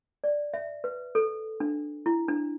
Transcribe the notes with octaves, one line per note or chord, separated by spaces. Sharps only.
D5
E5
B4
A4
D4
E4
D4